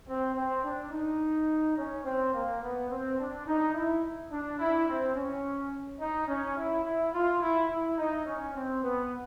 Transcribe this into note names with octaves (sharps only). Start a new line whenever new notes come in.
C4
C4
D4
D#4
C#4
C4
A#3
B3
C4
D4
D#4
E4
D4
E4
C4
C#4
D#4
C#4
E4
E4
F4
E4
E4
D#4
C#4
C4
B3